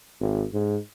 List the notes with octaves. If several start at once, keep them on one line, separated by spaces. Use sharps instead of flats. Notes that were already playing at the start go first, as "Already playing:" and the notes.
G#1
G#2